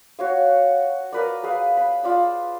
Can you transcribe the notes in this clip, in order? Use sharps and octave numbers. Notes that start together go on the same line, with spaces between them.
F#4 C#5 F5
A#4 B4 D5
G#4 B4 F5
B5
F4 D5 E6